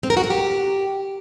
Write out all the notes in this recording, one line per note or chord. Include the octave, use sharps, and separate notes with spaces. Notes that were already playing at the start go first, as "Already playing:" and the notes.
C4
A#4
F#4
A#4
G4